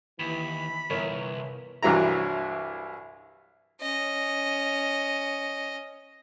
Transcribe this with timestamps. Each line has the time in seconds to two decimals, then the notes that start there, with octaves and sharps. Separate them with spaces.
0.19 D#2 E3 B5
0.90 G1 C2 E3 A#4 C#5
1.83 C2 G2 E3 F#3 E4 A#5
3.81 C#4 D#5